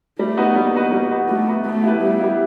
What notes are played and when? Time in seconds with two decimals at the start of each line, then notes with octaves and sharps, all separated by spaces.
0.19 G3 A3
0.37 B3 D#4 F#4 B4
0.56 G3 A#3
0.74 B3 D#4 F#4 B4
0.92 G3
1.10 B3 D#4 F#4 B4
1.28 G3 A3
1.47 B3 D#4 F#4 B4
1.65 A3 B3
1.83 E4 G4 B4
2.02 G3 B3
2.19 E4 G4 B4